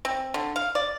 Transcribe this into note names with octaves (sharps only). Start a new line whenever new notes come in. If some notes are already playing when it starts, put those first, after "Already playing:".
C4
D3
F5
D5